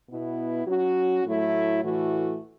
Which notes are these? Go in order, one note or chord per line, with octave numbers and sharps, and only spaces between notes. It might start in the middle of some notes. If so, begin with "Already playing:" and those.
B2 B3 E4
F#3 C#4 F#4
A2 F#3 A3 E4
A2 E3 A3 F#4